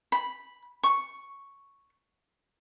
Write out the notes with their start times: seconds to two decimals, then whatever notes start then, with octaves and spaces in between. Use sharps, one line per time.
0.12 B5
0.83 C#6